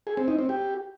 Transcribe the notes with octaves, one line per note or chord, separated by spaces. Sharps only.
G#4
C4
D#4
C4
G4